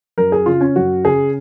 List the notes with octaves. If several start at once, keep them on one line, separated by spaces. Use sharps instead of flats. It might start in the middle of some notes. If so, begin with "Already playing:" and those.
F#2 A#4
G#4
C#3 F4
C#4
F#2 F#4
C#3 G#4